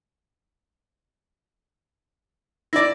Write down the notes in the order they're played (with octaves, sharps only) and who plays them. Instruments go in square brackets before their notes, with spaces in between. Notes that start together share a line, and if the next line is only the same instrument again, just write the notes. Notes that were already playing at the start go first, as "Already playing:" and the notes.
[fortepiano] E4 D5 [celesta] A#6